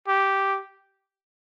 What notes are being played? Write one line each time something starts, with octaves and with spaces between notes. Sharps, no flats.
G4